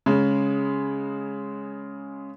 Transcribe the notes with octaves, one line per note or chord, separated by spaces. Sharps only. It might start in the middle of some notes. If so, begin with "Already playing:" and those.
C#3 G#3